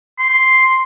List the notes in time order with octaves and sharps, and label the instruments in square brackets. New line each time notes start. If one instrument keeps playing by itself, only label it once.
[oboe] C6